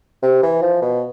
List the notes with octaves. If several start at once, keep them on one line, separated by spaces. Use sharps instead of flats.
C3
E3
F3
B2